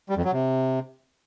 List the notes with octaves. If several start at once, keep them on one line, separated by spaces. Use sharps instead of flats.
G3
F2
F#3
C3